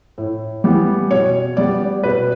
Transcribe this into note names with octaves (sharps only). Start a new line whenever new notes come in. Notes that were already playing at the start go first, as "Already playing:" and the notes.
A2
E3 G3 B3
B2 C#5
G3 B3 D5
B2 B4